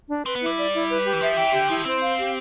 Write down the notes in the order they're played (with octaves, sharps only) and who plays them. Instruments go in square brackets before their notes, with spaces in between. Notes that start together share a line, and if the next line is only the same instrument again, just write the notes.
[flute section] D4
[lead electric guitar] C4 [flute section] B4
[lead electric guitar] B3
[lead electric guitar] G3 [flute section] E4
[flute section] D5
E4
B4
G4
[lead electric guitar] E3
[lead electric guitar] F3 [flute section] E5
[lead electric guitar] E3 [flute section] G5
[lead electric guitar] D3 [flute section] G4
[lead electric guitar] F3 [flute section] E4
[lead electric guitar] C4 [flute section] C5
[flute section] F5
G4